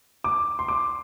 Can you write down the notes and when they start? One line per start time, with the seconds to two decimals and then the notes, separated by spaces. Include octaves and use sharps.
0.24 D6
0.59 C6
0.68 D6